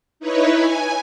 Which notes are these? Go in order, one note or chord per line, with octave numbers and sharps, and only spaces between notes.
D#4 E4 B4 C#5
G#5